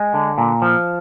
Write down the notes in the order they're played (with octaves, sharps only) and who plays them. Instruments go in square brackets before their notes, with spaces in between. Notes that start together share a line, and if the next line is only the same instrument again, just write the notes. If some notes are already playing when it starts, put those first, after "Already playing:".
Already playing: [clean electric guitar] G#3
D3
A#2
F3